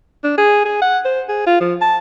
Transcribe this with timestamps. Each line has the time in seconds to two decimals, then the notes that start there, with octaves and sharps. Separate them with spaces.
0.23 D4
0.38 G#4
0.65 G#4
0.81 F#5
1.05 C5
1.28 G#4
1.47 F4
1.60 F3
1.81 A5